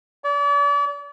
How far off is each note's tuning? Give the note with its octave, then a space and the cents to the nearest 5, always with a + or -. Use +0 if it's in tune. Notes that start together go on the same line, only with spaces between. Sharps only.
D5 -40